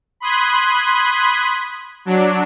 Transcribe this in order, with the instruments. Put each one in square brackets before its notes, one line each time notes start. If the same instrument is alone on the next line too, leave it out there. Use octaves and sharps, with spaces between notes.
[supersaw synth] B5 C6 D#6 F#6 G#6 B6
F#3 D4